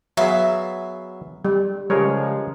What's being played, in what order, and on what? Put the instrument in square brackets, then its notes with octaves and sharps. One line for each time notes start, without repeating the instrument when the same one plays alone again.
[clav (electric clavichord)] F#3 B3 G#4 [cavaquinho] E5 F5
[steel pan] G3
[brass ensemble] C#3 F3 G#3 [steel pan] G3 [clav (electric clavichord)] G#4 A#4 C#5